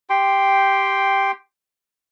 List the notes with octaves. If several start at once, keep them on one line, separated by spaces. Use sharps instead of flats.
G4 G5 C6